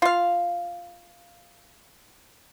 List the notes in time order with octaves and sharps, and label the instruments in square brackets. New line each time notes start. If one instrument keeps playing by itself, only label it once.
[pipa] F4 F5